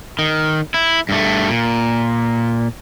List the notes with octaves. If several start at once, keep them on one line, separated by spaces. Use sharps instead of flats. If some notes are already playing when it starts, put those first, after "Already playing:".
D#3
E4
G2 A3
A#2